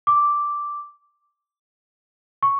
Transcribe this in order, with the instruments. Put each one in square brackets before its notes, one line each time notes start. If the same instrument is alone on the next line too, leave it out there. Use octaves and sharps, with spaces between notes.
[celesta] D6
C#6